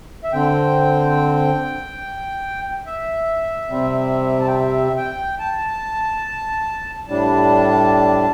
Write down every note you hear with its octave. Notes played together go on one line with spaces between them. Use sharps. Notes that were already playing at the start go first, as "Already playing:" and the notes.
E5
D3 C4 G5
E5
C3 G3 C4
A5
G5
E5
G5
A5
A2 G3 D4 A5